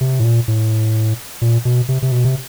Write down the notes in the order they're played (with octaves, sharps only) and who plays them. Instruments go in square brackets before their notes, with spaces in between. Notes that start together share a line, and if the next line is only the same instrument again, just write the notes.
[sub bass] C3
A2
A#2
A2
A#2
B2
C3
C3
B2
C3